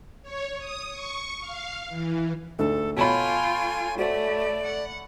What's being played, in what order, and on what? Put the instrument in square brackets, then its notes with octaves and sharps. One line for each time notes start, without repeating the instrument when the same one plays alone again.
[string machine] C#5
D#6
C#6
F5
E3
[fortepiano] D2 G#2 [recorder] A4
[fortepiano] B2 [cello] F4 G5 [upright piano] A4 C#5 B5 [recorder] G#5
[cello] A3 [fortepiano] F#4 C5 [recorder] D5
[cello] F#5